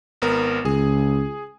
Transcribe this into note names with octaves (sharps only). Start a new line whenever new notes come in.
G#1 B3 A#4
C#2 G#4